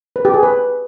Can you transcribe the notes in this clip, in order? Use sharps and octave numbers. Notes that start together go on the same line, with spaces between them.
B4
G4
G#4
B4